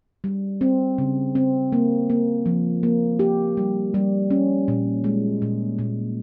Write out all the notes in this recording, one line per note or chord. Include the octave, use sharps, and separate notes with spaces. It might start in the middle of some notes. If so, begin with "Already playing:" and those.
G3
C4
C#3
C4
A#3
A#3
F3
A#3
G4
G3
G3
C#4
A#2
G#3
A#2
A#2